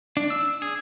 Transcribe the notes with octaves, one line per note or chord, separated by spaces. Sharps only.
D4
E6
G#4